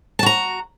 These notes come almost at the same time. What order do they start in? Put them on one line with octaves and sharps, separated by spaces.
A5 F#4 A#5